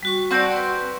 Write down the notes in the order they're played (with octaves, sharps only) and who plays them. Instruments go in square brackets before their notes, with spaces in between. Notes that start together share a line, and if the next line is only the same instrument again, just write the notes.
[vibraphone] G3 F#4 C#6
[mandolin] C4 F#4 G5 [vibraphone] D5 A5 C#6
[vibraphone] B4 C6